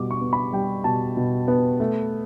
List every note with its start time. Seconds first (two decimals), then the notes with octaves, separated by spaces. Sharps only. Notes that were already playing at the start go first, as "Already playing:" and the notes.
Already playing: B2 G3 D6
0.11 C#6
0.21 B3
0.33 B5
0.53 G3 G5
0.84 B2 A5
1.17 B2
1.48 B3
1.80 A3